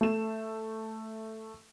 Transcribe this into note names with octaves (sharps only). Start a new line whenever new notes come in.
A3 E7